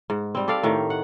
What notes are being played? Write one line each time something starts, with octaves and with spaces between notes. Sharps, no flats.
G#2
G3 C4
G4 A4 D5 F5
A2 D#3
F#5